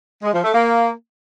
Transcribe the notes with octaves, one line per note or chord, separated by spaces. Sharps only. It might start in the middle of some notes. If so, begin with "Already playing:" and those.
G#3
F3
A3
A#3